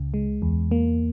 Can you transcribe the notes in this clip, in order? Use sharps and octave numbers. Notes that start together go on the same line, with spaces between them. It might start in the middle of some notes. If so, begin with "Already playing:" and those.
Already playing: C#2 C#3
G#3
E2
A#3